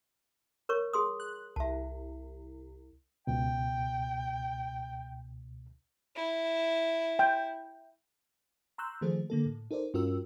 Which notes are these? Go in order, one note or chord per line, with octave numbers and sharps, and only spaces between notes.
A#4 C#5 C#6
G#4 C6 D#6
F#6
C2 E5 A5
C#2 B2 G5
E4
G5
A#5 C6 C#6 E6 F#6 G6
D#3 F3 A3 G#4 A4 C5
D3 A#3 A4
A2
D#4 A4 A#4 C5 D5
G2 C#4 F4 F#4 A#4 E6